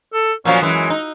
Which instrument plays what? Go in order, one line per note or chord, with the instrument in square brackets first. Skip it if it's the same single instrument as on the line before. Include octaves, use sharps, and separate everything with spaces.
[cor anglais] A4
[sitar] A#2 F3 F#3 [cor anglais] C#4
[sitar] F#2 E3 [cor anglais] G#3
[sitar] D#4